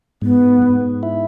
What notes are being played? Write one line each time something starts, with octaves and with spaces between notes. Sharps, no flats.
G#2 B3
G#2
E4